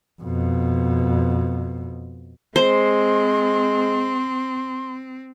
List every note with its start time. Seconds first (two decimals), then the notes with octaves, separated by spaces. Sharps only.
0.22 F2 B2
2.56 G#3 C4 C5 C6